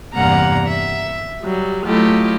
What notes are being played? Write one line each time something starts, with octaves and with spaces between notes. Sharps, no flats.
E2 G2 C3 A#3 F#5 A#5
E5
F#3 G3
F#3 A3 E4 F4 G4 D#5